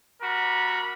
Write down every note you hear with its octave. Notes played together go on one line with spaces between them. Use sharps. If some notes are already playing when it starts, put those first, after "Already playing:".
G3 F#4 A#4 B5